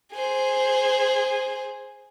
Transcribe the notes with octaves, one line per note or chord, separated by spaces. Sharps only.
G#4 C5